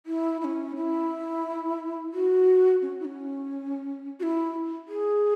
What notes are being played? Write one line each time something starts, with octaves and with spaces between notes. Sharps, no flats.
E4
E4
C#4
E4
F#4
C#4
E4
C#4
F#4
E4
G#4